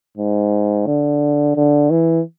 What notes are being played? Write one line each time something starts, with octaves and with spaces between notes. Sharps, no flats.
G#2
D3
D3
E3